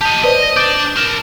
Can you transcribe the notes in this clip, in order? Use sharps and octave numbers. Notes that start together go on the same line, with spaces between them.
G4 D#5 A5
B4 C5 D5 D#5
A#6
D4 D5 D6 G6 D7
A#4 A5